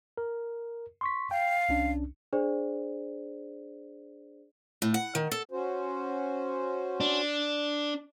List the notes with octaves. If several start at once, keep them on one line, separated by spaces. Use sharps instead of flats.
A#4
C6 C#6 B6
F5 G5
C2 C#4 D4
D4 G#4 C5 D5
A2
F#5
D#3
A4
C#4 F#4 C5
D4